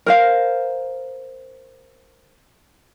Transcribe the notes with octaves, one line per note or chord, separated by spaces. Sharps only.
A#4 C5 F5